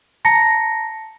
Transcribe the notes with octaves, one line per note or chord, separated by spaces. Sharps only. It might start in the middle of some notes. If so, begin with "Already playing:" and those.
A5 A#5 A#6 C#7